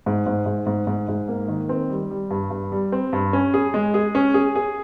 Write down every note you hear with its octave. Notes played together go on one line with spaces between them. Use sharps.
G#2
G#2
G#2
G#2
G#2
G#2
A#3
D#3
C4
G3
G3
G2
G2
G3
C4
G2
C#4
G#4
G#3
G#4
C#4
G#4
G#4